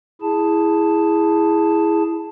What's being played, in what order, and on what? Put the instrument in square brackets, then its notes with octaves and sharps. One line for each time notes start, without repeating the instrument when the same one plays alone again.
[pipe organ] E4 G#4 A5